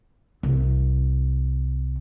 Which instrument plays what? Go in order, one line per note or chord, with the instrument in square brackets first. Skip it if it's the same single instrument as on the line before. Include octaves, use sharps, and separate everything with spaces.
[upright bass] C2